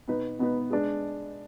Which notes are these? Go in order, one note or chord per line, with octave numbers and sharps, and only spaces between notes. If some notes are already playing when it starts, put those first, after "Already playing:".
B2 B3 D#4 B4
B2 B3 D#4 B4
G#3 D4